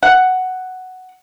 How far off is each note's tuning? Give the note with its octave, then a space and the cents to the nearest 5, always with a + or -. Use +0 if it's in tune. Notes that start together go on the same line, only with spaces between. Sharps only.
F#5 +5